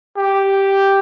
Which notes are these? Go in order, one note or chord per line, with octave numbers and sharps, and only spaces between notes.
G4